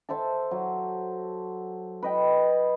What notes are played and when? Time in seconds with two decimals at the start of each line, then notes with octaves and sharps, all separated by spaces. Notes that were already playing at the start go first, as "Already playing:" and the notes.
0.09 A4 C5 E5 A5
0.51 F#3
2.03 B4 D#5 G5